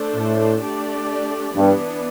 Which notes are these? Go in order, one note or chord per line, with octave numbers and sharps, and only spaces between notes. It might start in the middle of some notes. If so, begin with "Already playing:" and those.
Already playing: A3 D4 A4 C5
A2
A3 D4 G4 D5
G2 E3 B3 D4